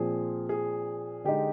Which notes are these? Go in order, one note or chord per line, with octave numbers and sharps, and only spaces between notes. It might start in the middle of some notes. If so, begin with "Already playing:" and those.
Already playing: A#2 F3 C4 G#4
G#4
D3 G#3 D#4 G4